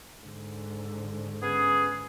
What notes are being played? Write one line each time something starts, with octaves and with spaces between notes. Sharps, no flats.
G#2 D3
B3 C#4 G#4